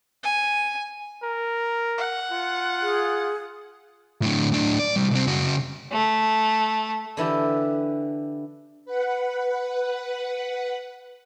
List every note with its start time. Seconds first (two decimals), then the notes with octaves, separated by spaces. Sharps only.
0.24 G#5
1.23 A#4
1.98 F#5
2.31 F4
2.82 G#4
4.22 A2 D3
4.52 A2 D4
4.80 D5
4.96 C2 G3
5.11 C2 C4
5.27 C#3 F#4
5.92 A3
7.17 D3 E3 E4 G4
8.85 B4 F#5